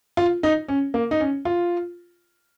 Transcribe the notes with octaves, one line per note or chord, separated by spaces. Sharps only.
F4
D#4
C#4
A#3
D#4
C#4
F4